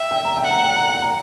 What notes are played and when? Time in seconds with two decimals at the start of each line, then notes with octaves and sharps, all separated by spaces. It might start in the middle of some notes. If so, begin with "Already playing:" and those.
Already playing: E5 G5
0.11 G5
0.25 A#5
0.37 G5
0.44 F#5
0.51 A#5
0.63 G5
0.76 A#5
0.89 G5
1.02 A#5